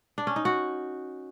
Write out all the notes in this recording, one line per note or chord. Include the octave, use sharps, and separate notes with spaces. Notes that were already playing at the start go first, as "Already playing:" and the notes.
D4
C#4
D#4
F#4